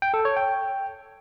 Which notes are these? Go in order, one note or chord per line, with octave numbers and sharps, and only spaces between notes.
G5
A4
C#5
G5